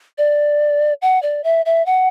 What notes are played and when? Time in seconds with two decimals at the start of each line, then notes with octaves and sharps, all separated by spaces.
0.18 D5
1.02 F#5
1.23 D5
1.44 E5
1.66 E5
1.86 F#5